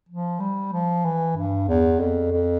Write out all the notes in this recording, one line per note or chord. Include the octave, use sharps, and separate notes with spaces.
F3
G3
F3
E3
G2
E2
F2
F2